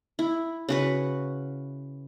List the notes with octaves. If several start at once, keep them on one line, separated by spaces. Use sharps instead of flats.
E4
C#3 F#4 B4